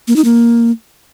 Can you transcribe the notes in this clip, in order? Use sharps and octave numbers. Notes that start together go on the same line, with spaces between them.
A#3
D#4
A#3